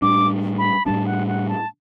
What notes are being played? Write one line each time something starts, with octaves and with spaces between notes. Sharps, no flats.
A2 G3 D4 D6
B5
A2 G3 D4 A5
F#5
F#5
A5